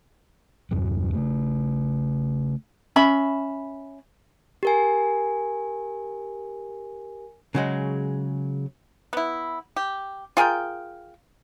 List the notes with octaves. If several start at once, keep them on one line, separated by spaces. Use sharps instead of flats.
E2 G2 C3 F#3
C#3 A3
C#4 E5 B5
G4 A#4 G#5
C#3 F#3 G#3
B3 E4
G4
F4 G#4 A#4 G5